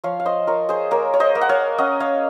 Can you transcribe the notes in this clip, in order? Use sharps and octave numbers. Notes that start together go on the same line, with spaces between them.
F3 C#5 F5
F5
C5 D#5
F4 A#4 C#5
G#4 C5
A#3 A#4 C#5
C#5
C5 D#5
A#3
F#5
C#5 F5
C#4 D#5 F#5
C#5 F5